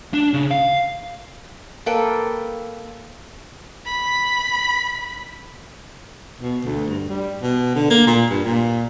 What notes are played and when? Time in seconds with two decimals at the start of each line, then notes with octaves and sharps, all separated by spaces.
0.14 D4
0.34 C#3
0.51 F5
1.86 A#3 A4 B4 G5
3.86 B5
6.40 B2
6.64 D2
6.88 G2
7.09 G3
7.42 B2
7.75 D3
7.90 A#3
8.07 A#2
8.30 G2
8.45 A#2